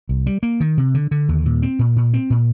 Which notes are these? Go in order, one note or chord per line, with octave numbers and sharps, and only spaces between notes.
C2
G3
A#3
D#3
C3
D3
D3
D#2
A#2
C4
A#2
A#2
C4
A#2